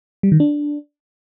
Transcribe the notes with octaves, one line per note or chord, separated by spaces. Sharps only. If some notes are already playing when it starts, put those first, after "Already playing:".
G3
D#3
D4